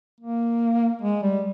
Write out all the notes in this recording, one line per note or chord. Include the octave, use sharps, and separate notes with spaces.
A#3
G#3
G3